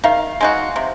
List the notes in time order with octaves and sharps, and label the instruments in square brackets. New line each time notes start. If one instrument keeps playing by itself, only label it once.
[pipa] D#3 [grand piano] F5
[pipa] G#3 D#4 F#4
C3